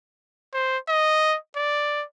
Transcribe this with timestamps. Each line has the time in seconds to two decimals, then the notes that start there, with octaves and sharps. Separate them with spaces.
0.54 C5
0.89 D#5
1.56 D5